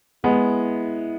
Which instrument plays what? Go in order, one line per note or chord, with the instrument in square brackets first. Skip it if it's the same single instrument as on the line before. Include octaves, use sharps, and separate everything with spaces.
[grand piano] G#3 B3 [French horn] E4